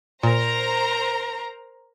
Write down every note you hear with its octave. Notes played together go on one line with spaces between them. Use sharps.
A#2 A#4 C5 A#5